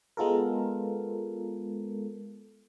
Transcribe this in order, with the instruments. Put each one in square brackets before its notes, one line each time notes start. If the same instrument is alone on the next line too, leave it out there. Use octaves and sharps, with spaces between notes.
[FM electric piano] G#3 B3 F4 A4 A#4